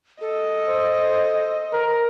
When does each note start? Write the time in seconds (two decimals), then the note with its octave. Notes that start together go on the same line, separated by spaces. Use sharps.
0.21 A4 D#5
0.68 C5
1.73 A#4